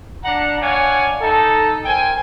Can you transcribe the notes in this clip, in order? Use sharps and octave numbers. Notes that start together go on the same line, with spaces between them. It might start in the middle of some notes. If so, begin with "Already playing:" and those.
D4 F#5 A#5
D4 C#5 D5 F5 F#5 G#5
D#4 A4
A#4 C5 G5 G#5